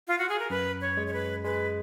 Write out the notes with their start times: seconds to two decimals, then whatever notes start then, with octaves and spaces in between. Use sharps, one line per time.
0.08 F4
0.18 F#4
0.29 G#4
0.39 A#4
0.50 F#2 B4
0.81 C#5
0.97 G#3
1.07 C#5
1.13 B4
1.45 G#3 B4